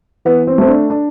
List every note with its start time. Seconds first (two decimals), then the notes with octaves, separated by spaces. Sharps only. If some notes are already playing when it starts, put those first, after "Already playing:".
0.25 E3 B3
0.47 C4
0.58 A3 C4
0.68 D4
0.90 D4